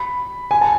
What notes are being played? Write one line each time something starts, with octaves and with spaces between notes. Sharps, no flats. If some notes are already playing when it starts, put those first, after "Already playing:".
Already playing: B5
G#5
A5